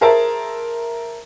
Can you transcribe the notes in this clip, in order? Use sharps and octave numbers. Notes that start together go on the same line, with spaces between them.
G#4 A#4 C5 E5 A5